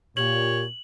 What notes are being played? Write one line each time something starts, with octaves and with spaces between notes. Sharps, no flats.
A#2 G4 C#5 F#7